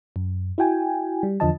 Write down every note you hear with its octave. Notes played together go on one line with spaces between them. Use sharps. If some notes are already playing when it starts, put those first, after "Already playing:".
F#2
E4 F#4 G5 G#5
G3
E2 D3 F3 D#5 A5